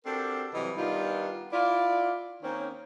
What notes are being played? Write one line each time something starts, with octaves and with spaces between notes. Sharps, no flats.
C4 D4 F#4 G4 A4 A#4
C3 E3 F#3 G3 D#5
D#3 G3 B3 D4 D#4 F4
E4 F4 D5
D#3 A#3 C4 C#4